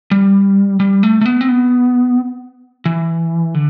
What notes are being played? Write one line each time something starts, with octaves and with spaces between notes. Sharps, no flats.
G3
G3
A3
A3
B3
C4
B3
E3
D3